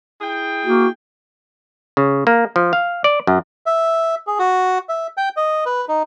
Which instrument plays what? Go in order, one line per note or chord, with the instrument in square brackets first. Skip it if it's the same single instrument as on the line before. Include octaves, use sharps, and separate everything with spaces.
[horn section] E4 G#4 G5
[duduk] A#3 [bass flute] F#4
[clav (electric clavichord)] C#3
A#3
F3
F5
D5
F#2
[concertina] E5
G#4
F#4
E5
G5
D#5
B4
D#4